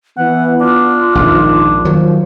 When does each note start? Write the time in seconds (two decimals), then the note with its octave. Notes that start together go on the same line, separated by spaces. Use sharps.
0.18 E3 B3 F#5
0.61 D4 F4
1.15 A#1 F2 G#2 D#3
1.85 D#3 F3 F#3